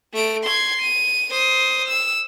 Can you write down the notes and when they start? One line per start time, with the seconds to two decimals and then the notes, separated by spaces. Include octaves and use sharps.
0.14 A3 D7
0.44 C6 G#6
0.82 D#7
1.31 C5 D#6
1.88 E6